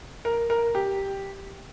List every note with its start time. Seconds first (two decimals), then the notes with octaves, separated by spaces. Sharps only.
0.25 A#4
0.50 A#4
0.75 G4